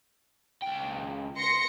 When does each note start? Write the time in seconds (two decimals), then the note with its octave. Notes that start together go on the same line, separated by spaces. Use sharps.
0.62 C#2 G5
1.37 C6 A#6 C#7